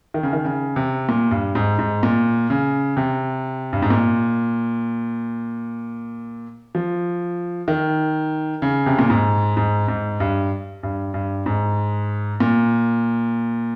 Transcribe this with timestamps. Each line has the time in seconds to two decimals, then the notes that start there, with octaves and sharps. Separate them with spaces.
0.14 D#3
0.23 C#3
0.33 D#3
0.45 C#3
0.76 C3
1.09 A#2
1.31 G2
1.55 G#2
1.79 G#2
2.03 A#2
2.50 C#3
2.97 C3
3.73 G2
3.82 G#2
3.90 A#2
6.75 F3
7.68 D#3
8.62 C#3
8.86 C3
8.99 A#2
9.10 G#2
9.57 G#2
9.88 G#2
10.20 G2
10.83 G2
11.14 G2
11.46 G#2
12.40 A#2